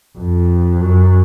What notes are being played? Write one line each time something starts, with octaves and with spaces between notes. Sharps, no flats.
F2
F#2